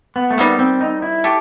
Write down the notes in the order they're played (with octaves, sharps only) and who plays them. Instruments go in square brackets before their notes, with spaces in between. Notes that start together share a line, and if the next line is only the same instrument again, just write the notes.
[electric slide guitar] B3
A3
[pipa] C3 D#3 G3 [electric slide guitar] B3
[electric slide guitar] C4
D#4
E4
[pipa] A3 [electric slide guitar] G4